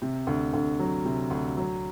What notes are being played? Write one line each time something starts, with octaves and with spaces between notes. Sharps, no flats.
C3
D2
D2
F#3
C3
D2
F#3